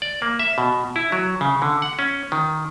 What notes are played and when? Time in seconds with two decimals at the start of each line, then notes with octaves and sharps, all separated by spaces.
0.02 D5
0.22 A#3
0.39 E5
0.58 B2
0.96 E4
1.12 F#3
1.41 C#3
1.62 D3
1.82 F#5
1.99 C#4
2.32 D#3